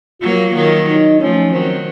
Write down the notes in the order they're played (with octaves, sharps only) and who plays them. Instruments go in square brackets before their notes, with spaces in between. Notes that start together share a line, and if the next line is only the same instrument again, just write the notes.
[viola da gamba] F#3 A#3 [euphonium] F4
[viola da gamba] D#3 F#3
[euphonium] D#4
[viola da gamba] F3 A3 [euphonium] C#4
[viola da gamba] D#3 F#3 [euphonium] C4